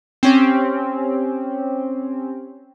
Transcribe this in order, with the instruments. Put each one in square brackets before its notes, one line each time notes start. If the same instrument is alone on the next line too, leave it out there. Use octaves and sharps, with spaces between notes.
[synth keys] C4 C#4 G4